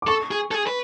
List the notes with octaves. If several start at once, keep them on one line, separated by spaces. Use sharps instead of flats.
D6
A4 C#6
G#4
A4
G#4
B4